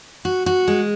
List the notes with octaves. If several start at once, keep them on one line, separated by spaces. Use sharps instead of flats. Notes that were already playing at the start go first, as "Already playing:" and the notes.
F#4
F#4
G#3